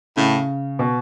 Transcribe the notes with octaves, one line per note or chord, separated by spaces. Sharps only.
A2 C#3
B2